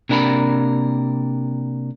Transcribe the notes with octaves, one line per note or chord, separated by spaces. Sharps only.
C3 A#3 D4 A#4 A#5 B5